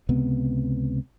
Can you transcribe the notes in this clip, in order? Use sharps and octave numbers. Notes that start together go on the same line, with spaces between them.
C#2 C3 B3